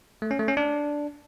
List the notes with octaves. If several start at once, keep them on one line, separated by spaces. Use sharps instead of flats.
A3
C#4
A3
C#4
D4